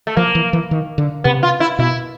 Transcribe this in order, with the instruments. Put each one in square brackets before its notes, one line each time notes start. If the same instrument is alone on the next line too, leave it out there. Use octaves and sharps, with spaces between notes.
[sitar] A3
[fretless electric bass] F3 [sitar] A#3
[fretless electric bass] E3
E3
D#3
D3
[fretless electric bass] C3 [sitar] B3
[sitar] F4
E4
[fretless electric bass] B2 [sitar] E4